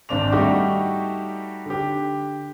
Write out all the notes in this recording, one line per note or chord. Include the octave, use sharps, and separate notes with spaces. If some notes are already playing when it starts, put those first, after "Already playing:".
G#1 C4 D4 D6 F7
G3 A3 D#4 F#4 G4
D3 G4